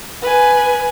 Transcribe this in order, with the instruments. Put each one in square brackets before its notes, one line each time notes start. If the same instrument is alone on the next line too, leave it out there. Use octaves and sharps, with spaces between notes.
[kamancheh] B4 G#5